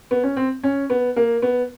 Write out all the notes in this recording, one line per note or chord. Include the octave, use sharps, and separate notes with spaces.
B3
C#4
C4
C#4
B3
A#3
B3